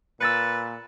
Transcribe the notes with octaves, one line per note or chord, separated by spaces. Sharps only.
A#2 B4 E6 A6 C#7